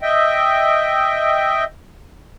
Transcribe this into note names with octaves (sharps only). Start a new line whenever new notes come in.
D#5 E5 G5